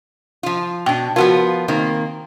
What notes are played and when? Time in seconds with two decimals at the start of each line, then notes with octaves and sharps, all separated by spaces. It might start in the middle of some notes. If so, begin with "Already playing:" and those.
0.43 F3 F4
0.86 B2 D4 G5
1.16 F3 B3 F4 F#4 A#4
1.68 D#3 A#3 C4